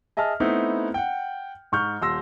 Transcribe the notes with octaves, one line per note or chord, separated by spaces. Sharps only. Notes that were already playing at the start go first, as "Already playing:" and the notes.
G#4 D#5 E5 A5 F6
A3 B3 C4 D#4 E4
F#5 G5
G#2 C#6 F6 G6
D#1 C6 E6 A#6